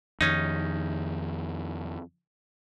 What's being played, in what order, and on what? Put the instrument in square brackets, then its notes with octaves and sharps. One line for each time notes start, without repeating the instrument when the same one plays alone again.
[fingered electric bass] F2 D#3 [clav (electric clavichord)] C#4 D#4